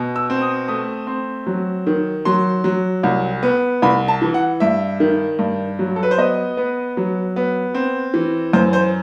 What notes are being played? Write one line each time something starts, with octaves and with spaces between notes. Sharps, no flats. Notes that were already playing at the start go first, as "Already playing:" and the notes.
Already playing: B2
E6
C4
D#6
A3 D#6
C4
F#3
D#3
F#3 C6
F#3
C2
B3
C2 B5
A5
E3
F#5
G2 E5
D#3
G2
F#3
A4
B4
C5
B3 D#5
B3
F#3
B3
C4
E3
F#2 C5
C5